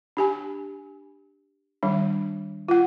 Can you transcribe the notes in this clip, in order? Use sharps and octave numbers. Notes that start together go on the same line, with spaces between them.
D4 G4 G#5
D#3 G3 D4
F4 F#5